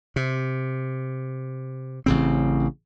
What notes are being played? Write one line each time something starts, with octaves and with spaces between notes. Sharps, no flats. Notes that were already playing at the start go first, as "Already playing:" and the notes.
C3
A1 C#3 C4